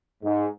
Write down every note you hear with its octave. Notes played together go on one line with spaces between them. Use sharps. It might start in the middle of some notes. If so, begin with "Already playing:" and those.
G#2